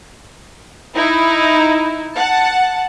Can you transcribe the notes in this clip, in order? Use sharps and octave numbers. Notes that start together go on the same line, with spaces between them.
D#4 E4
F#5 A5